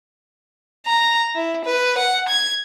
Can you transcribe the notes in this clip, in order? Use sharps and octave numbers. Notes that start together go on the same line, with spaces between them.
A#5
E4
B4
F#5
G#6